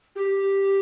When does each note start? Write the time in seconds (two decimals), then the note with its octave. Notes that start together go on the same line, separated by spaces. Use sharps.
0.16 G4